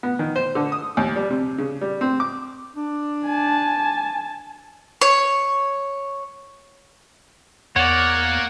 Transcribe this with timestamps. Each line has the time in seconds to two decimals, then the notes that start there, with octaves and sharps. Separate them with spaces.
0.03 B3
0.19 D#3
0.36 C5
0.55 D3
0.72 D#6
0.97 D#2
1.16 G3
1.30 C3
1.58 C#3
1.81 G3
2.01 C4
2.20 D6
2.75 D4
3.25 G#5 A5
5.01 C#5
7.76 E2 A#3 C#5 D5 F#5